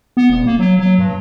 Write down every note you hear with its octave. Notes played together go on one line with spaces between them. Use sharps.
B3
D#1
A#3
F#3
F#3
G2